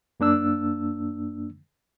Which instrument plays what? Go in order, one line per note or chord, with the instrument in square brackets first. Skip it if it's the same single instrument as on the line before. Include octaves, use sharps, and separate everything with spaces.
[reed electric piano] F#2 A#3 D4 E6